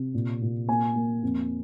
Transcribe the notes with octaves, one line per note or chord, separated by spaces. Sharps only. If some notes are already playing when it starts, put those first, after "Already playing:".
Already playing: C3
A#2
A#2
A#3 G#5
A#3
F2